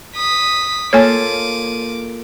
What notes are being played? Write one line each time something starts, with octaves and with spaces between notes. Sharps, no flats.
D#6 B6
A#3 F4 A4 C#5 G#5 D6 D#7